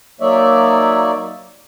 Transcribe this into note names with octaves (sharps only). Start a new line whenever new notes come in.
F#3 A#3 D#4 C#5 D5 E5